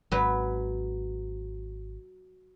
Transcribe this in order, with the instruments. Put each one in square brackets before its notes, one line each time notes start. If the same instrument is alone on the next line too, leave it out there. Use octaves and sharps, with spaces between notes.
[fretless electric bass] G#1 [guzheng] F#3 B4